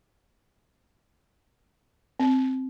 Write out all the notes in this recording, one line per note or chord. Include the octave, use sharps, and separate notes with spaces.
C4